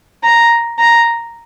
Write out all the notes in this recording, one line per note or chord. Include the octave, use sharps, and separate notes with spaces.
A#5
A#5